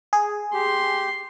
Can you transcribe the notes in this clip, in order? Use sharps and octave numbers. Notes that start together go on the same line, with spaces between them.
G#4
G4 C6